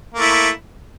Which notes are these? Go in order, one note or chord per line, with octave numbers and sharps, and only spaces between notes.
A3 A#3 E4